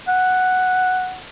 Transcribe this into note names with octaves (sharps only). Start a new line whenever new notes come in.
F#5